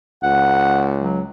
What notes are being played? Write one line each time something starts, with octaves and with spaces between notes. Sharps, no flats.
C#2 F#5
F#3